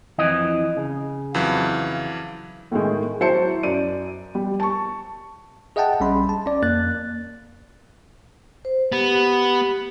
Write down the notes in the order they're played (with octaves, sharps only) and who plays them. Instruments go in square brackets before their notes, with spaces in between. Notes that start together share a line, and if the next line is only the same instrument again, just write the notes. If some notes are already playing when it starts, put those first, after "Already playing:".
[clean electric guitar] F2 E3 D#5
C#3
[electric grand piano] F2 E3 F#3 [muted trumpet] F5
[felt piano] A2 D#3 G#3
F#3 E4 C5 A5 C#7
F#2 D5 D#7
G3
A5 C#6
[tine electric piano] G#4 D#5 E5 F#5 G5 A5
A#1 G3 C#4 B5 C6
A5
C#4 D5
F2 A#3 F#6 A6
[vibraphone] C5
[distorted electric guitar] B3 [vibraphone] G4